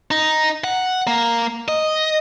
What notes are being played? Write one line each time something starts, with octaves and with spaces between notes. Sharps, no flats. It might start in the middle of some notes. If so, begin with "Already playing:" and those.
D#4
F#5
A#3
D#5